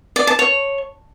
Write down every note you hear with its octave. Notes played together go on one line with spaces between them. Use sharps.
D5
A5
C#5